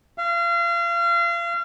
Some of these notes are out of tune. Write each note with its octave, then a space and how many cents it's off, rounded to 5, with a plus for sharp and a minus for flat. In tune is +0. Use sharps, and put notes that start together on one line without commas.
F5 -35